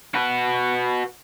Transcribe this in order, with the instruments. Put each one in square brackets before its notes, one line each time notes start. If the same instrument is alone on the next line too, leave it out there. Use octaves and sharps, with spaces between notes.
[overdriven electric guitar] F#4 B4